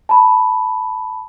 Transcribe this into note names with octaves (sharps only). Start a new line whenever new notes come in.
A5 B5